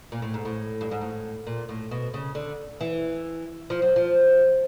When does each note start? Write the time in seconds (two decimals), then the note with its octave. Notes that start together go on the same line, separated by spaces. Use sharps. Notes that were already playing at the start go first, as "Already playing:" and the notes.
0.12 A#2
0.22 A2
0.34 G#2
0.45 A2
0.81 G2
0.91 G#2
1.01 A2
1.47 A#2
1.69 A2
1.91 B2
2.14 C#3
2.35 D3
2.81 E3
3.70 F3
3.82 F#3
3.96 F3